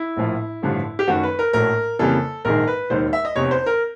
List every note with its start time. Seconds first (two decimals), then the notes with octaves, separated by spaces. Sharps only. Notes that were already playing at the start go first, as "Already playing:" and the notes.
Already playing: E4
0.17 A#1 A2 F3
0.63 A1 G2 D3 F3 A3
0.99 G4
1.08 F#2 D#3 F#3 A3 F#4
1.23 B4
1.39 A#4
1.53 A#1 A2 F#3 A3 A#4
1.99 F2 C#3 E3 G3 A#3 A4
2.45 A#1 G#2 D#3 G#3 A#4
2.67 B4
2.90 E1 D#2 D#3 C5
3.13 E5
3.25 D#5
3.36 F1 E2 C3 C#5
3.51 C5
3.66 A#4